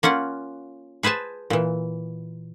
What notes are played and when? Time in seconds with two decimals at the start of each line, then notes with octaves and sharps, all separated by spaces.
0.03 A#3 C#4 F4 F#5
1.03 G#4 B4 C5 G#5 A5
1.50 A#2 E3